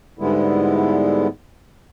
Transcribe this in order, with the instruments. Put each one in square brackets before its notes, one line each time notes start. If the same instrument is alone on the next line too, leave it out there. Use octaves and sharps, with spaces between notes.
[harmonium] G#2 D3 G3 G#3 B3 E4